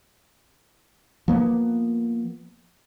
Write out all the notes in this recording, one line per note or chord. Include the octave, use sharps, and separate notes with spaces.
F3 A#3 B3